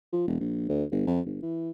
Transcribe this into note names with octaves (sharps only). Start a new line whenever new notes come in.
F3
E1
A#1
D2
G1
F2
G1
E3